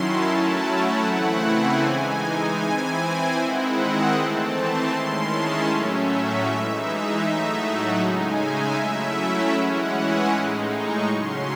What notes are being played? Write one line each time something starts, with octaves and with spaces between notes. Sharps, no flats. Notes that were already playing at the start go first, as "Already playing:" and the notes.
Already playing: D#3 F#3 C#4 E4 A5 C6
F#3 A3 C#4 E4
F#5
C#3 E3 A3 C4 E4
G#5
E3 G#3 D#4
E3 C4 E4 G#5
D#3 G#3 C4 E4 F#5
D#5
E3 A3 C4 A5
C6
D#3 G#3 C#4 E4
A5
A2 F#3 A3 C#4 E5
E3 G#3 D#4
E5
A2 F#3 A3 D#4
F#5
C#3 G#3 D#4 G#5
E5
F#3 A3 C#4 E4
E5
E3 G#3 C#4 E4 F#5
G#5
A2 G#3 D#4
C#6
C#3 F#3 C#4 C6